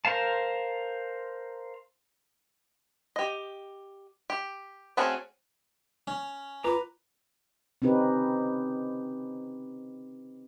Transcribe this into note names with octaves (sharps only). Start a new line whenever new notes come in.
A#4 C5 F5 A5
G4 D#5
G4
A3 C4 C#4 F#4 G#4
C#4
F4 B4 A#5 D6
C4 C#4 D#4 G4 B4